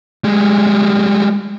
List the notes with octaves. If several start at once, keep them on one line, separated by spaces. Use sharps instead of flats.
G3 G#3